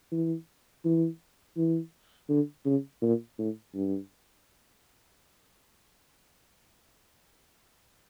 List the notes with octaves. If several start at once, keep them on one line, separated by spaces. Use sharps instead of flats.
E3
E3
E3
D3
C#3
A#2
A2
G2